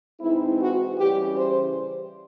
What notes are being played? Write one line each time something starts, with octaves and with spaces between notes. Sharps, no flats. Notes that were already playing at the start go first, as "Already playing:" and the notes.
G#2 E3 G#3 C4 D#4 E4
F#4
C#3 E3 G3 G4
C5